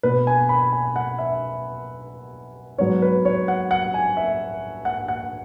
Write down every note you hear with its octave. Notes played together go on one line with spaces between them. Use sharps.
B2 B3 B4
G#5
B5
G#5
F#5
E5
G#2 F#3 B3 C#5
B4
C#5
F#5
F#5
G#5
E5
F#5
F#5